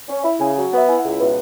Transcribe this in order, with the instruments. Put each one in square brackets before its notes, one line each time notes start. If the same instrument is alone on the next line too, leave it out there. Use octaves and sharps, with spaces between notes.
[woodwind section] C#4
[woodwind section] E4 [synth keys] B5
[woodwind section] C#3 [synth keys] G#5
[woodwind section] F#3 [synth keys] G#5
[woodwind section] B3
[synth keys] E5
[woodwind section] E4 [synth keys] G#5
[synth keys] F#5
[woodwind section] C#2 [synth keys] E5
[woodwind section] B2 [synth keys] B4